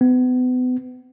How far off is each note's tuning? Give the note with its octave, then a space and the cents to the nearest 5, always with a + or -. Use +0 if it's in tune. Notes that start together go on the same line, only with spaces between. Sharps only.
B3 +35